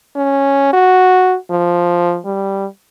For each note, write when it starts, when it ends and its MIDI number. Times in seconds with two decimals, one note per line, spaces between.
0.15 0.69 61
0.73 1.37 66
1.51 2.18 53
2.25 2.66 55